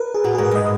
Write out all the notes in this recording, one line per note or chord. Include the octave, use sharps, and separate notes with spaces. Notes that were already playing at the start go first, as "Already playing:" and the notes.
Already playing: A#4 B4
G#4
A#2 F#4
G#2 G#4
B4
G#2 D#5